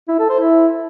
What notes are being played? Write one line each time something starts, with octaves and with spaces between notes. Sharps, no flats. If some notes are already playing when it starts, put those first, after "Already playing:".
E4
A4
C5
E4